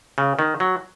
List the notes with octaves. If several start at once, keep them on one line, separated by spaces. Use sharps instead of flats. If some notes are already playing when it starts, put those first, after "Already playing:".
C#3
D#3
F#3